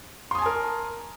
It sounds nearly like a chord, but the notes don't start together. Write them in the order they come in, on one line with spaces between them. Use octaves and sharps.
C6 D#6 G#5 A5 A#4